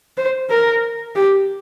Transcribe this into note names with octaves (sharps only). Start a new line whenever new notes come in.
C5
A#4
G4